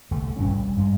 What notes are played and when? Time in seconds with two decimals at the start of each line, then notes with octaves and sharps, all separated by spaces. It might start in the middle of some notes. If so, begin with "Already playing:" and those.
0.11 C2 D3 A3
0.36 G#1 G2 A#2 C#4
0.54 G3
0.76 G2 G#3